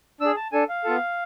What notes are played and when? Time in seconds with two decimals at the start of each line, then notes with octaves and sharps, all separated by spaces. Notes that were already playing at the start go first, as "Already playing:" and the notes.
0.20 D4 G#4 E6
0.36 A5
0.52 D4 A4 G#5
0.69 F5
0.84 B3 F4 A4